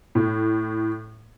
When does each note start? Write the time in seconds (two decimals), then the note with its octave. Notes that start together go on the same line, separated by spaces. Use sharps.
0.15 A2